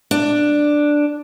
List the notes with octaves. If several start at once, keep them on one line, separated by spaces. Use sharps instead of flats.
D4